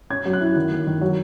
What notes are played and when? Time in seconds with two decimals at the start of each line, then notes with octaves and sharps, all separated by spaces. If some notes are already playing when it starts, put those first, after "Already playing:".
0.10 C#4 G#6
0.25 F#3
0.33 F#6
0.41 E4
0.56 D#3
0.72 A#3
0.87 D#3
1.01 F#3